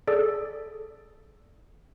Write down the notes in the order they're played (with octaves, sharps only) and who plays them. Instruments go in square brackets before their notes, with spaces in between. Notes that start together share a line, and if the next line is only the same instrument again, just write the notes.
[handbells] G#4 A4 D5